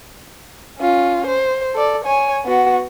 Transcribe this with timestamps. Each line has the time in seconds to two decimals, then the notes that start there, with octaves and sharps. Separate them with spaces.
0.79 C#4 F4
1.27 C5
1.75 A4 D5
2.05 C#5 G#5
2.45 B3 F#4